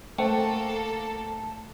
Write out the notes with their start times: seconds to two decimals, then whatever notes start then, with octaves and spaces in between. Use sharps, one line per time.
0.18 A3 A#3 A4 C5 F#5 G5 A5